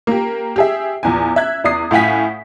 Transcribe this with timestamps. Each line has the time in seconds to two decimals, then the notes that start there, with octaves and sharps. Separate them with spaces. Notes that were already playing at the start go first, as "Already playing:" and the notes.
0.07 A#3 G4
0.56 G4 G#4 E5
1.03 A#1 E2 G#5
1.36 E5 F#6 G#6
1.64 E2 E4 D5 D#6 C7
1.91 A2 F5 F#5 G#5 B6